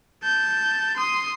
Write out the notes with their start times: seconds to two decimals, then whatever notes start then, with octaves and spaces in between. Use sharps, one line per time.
0.23 A5 G6
0.97 C6 D#6